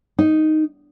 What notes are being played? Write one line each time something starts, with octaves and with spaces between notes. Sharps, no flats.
D#4